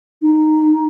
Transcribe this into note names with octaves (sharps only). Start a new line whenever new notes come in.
D#4